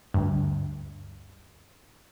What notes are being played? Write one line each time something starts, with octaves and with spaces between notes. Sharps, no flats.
D2 G2